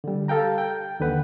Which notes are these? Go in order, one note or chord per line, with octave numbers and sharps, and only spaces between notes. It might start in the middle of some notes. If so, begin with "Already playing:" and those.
D3 G3
G4 A4 F5 G5 A#5
G5 G6
D#2 D3 B4 F#5